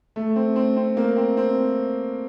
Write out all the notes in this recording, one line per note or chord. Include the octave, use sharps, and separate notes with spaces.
A3
C4
C4
C4
A#3
C4
C4